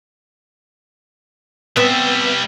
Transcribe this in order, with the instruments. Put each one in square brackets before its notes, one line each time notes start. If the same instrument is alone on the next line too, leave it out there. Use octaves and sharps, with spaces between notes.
[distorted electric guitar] G3 E5 [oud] B3 C4